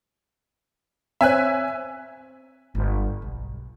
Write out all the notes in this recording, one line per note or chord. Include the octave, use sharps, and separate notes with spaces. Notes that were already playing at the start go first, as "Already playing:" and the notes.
C4 C5 C#5 E5 G#5 F#6
G1
B1